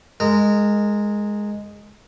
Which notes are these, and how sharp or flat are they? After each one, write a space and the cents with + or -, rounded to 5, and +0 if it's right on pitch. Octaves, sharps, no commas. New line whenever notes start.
G#3 +0 A#4 -20